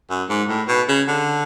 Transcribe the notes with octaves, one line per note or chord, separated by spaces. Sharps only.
F#2
G#2
A2
B2
C#3
D3